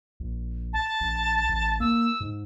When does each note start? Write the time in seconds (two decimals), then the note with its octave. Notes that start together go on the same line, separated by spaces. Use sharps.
0.20 A#1
0.73 A5
1.01 A#1
1.49 A1
1.80 A#3 E6
2.20 G#2